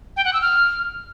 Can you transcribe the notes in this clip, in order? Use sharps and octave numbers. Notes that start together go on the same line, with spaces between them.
G5
F#5
E6
F6